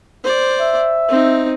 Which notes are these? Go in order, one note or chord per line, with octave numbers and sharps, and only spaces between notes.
C5 D5
E5
C4 D#4